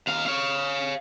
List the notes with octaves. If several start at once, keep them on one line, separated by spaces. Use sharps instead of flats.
D#2 F5
C#5 F5